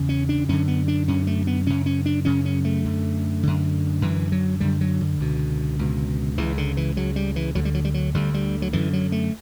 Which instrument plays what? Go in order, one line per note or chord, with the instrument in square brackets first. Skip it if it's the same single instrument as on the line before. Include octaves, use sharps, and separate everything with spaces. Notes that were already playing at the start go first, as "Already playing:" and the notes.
Already playing: [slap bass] E2 C#3
C#4
D4
F#2 D3 C#4
B3
D4
F#2 D3 C#4
A3
B3
F#2 C#3 C#4
C#4
D4
F#2 C#3 C#4
C#4
A3
F#2 D3
F#2 D3
F#2 D3 E3
F#3
F#2 D3 G3
F#3
D3
C#2 B2
C#2 B2
C#2 C#3 E3
D3
E3
C#2 C#3 F#3
G3
E3
D2 D3 F#3
G3
F#3
G3
F#3
D2 D3 G3
G3
F#3
F#2 D3 E3
F#3
A3